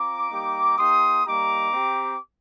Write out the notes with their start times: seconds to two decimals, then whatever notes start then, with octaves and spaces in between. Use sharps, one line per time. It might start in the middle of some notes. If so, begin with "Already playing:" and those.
Already playing: C4 F4 A#5 D6
0.31 G3 A#3 D#4 G4
0.78 A#3 D#4 G4 C6 D#6
1.25 G3 A#3 D#4 G4 A#5 D6
1.73 C4 G4